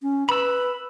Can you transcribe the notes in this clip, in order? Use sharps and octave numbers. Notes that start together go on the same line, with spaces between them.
C#4
B4 B5 E6